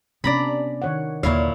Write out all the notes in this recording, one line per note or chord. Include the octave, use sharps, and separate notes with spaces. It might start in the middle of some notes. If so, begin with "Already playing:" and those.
C3 B3 C#4 D4 D5 A#5 B5
D#3 C#5 F#5
D#2 A#2 D3 E4 C#5 F5